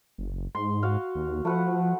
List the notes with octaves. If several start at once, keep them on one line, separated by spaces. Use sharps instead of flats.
F#1
G#2 C6
F#4 F5
D#2
F3 A3 B4 F#5